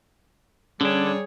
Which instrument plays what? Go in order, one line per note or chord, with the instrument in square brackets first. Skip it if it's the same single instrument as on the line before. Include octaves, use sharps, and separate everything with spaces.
[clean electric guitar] D3 D4 [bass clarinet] G3 [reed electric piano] C#4 [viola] G#4 C#5